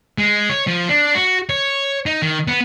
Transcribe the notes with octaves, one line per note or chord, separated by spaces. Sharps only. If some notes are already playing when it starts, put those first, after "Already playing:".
G#3
C#5
F3
D4
F#4
C#5
D#4
D#3
B3